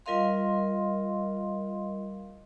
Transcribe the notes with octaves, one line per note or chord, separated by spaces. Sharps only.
G3 F4 A#4 D#5 F5 C6